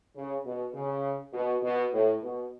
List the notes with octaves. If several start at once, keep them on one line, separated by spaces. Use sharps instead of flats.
C#3
B2
C#3
B2
B2
A2
B2